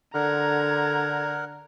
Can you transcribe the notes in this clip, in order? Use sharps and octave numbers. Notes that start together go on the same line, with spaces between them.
D3 A#4 F#5 A#5 G#6